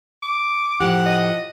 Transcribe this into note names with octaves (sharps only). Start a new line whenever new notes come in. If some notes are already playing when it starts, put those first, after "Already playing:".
D6
A2 F3 G4 F#5
D#5